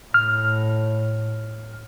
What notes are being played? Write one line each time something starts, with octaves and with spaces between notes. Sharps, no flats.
A2 F6